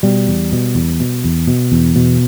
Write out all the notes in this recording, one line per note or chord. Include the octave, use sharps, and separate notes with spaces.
B2 G3
E2
B2
E2
B2
E2
B2
E2
B2